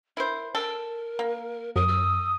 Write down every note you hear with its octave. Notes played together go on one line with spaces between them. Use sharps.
E4 A#4 C5
A4 A#4
A#3
F#2 A#4 D#6
E6